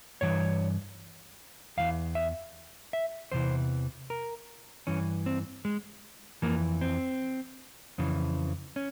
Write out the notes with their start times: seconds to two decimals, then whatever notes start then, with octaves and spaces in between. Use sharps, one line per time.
0.21 G2 E3 C#5
1.77 E2 E3 F5
2.15 E5
2.93 E5
3.32 E2 C3 E3 C5
4.10 A#4
4.87 G2 E3 C#4
5.26 C4
5.65 G#3
6.42 F2 E3 A#3
6.81 C4
7.98 F2 C#3 E3
8.76 C#4